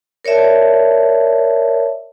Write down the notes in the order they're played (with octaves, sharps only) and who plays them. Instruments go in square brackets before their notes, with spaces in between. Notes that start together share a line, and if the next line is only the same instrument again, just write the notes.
[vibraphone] A#4 C#5 D5 E5 A5